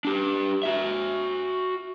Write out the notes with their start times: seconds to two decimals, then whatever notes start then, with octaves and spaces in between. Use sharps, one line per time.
0.05 D4 G4
0.63 F#4 E5